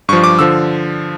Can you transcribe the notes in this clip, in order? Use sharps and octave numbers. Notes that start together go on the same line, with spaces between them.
G2 F3 C#6
D6
D3 F3 E6